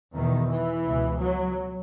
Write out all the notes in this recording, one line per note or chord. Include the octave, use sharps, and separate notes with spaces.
E2 B2 D#3
E3
C#2 B2
F#3